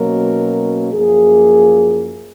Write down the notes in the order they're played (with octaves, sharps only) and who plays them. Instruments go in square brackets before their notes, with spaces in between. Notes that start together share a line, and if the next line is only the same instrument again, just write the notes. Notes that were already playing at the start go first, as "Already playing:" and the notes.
Already playing: [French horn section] B2 F#3 A#3 C#4 A#4
F#2 F3 A#3 G#4